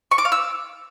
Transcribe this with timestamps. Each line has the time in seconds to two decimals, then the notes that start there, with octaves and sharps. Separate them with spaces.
0.11 C#6
0.18 D6
0.25 F5
0.32 E6